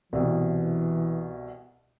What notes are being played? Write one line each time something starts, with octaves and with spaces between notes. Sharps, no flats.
C2 B2 E3